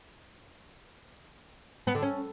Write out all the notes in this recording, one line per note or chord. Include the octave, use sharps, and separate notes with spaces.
B3
D3
C#4